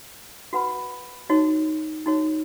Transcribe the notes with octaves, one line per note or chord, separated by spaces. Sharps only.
F#4 B4 F#5 B5
D#4 F#4 C#5
D#4 F#4 C#5